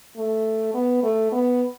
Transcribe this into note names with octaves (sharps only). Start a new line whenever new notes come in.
A3
B3
A3
B3